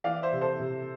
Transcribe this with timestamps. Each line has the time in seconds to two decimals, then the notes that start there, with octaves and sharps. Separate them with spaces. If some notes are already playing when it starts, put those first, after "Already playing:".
0.04 E3 D5 F5
0.22 C5 E5
0.32 C3
0.41 A4 C5
0.60 C3